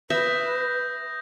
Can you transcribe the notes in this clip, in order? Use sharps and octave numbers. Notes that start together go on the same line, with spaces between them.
B4 E5 D#6 G6 A#6